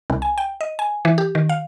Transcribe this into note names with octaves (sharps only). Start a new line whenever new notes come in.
C2
G#5
G5
D#5
G#5
E3
G4
D#3
F5